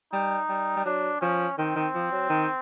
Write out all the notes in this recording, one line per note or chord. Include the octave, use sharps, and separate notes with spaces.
G3 D#4
G3
G3
F#3 D4
F3 C#4
D#3 C4
D#3
F3
F#3
D#3